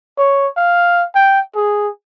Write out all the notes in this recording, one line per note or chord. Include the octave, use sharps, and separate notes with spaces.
C#5
F5
G5
G#4